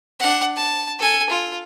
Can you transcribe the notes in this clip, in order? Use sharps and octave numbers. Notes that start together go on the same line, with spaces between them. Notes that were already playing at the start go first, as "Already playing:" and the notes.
D4 F#5
A5
A4 G#5
F4